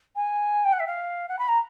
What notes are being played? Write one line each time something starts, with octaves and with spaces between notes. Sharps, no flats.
G#5
G5
F#5
E5
F5
F#5
B5
A#5